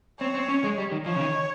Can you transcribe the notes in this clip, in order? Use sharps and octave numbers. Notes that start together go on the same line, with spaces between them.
C4 C#5
C4
C#4
G#3
G3
D#3
F3 C#5
C#3
D#3